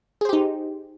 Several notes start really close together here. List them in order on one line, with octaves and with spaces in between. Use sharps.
G#4 C5 G4 D#4